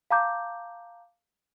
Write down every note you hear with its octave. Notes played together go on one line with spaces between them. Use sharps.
F5 A5 A#5 D6 G6